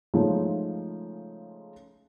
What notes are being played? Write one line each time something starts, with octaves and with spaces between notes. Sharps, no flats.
C#3 F3 G#3 A3 C#4 D#4